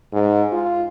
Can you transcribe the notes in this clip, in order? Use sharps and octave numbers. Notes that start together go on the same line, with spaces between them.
G#2
F4